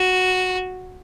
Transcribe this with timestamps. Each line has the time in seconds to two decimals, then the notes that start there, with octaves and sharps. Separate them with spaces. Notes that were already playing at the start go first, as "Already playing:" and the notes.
Already playing: F#4